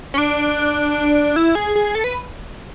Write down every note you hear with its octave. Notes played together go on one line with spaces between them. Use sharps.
C#4
D4
E4
G#4
G#4
A4
B4